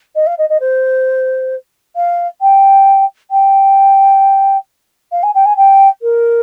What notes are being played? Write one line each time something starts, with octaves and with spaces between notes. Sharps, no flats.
D#5
F5
D#5
D#5
C5
F5
G5
G5
F5
G#5
G5
G#5
G5
A#4